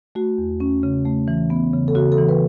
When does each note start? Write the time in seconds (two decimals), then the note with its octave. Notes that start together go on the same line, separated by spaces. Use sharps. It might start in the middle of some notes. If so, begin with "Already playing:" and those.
0.15 A3 F#4
0.38 E2
0.60 C#4
0.83 C#3
1.05 A3
1.28 E3
1.50 B3
1.73 C#3
1.88 A4
1.95 C#3 F#4
2.12 A4
2.18 E3
2.29 B4